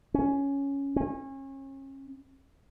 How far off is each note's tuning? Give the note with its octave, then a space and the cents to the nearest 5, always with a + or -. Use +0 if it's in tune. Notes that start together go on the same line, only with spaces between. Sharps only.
C#4 +5
C#4 -35